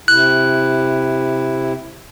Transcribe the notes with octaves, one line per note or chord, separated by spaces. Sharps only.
C3 E4 F#6